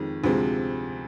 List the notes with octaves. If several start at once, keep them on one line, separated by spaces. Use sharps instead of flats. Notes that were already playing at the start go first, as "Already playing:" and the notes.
Already playing: F2 D#3 G#3
D2 C3 F3 G#3